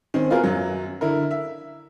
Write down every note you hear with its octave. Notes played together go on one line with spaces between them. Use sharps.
D#3 C4 C#4
B3 F4 F#4 G#4 A#4
F#2 F#3
D3 E4 A#4
E5